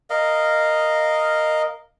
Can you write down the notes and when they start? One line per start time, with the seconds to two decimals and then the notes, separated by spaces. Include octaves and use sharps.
0.10 A#4 D#5 F5